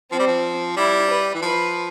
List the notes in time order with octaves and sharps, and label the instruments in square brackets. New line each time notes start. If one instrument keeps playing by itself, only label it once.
[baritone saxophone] F3 [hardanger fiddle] C4
[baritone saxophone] G3
F3
[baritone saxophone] G3 [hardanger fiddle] E4
[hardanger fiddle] B4
[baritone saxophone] E3
[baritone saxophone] F3 [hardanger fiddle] B4